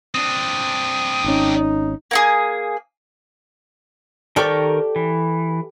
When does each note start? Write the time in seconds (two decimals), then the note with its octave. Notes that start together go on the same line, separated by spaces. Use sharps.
0.15 C4 D4 D#6
1.24 G#1 C#4 D#4
2.11 A#3 F#4 G#4
4.36 D#3 G4 A4 A#4 D5 C#6
4.96 E3